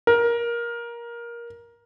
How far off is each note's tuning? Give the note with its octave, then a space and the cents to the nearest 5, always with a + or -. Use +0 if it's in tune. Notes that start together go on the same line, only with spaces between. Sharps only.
A#4 +15